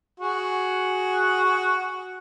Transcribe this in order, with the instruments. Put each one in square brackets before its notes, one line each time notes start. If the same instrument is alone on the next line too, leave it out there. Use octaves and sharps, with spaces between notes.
[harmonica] F#4 G#4